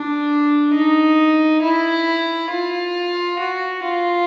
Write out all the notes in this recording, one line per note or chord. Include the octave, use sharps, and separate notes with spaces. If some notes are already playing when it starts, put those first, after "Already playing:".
Already playing: D4
D#4
E4
F4
F#4
F4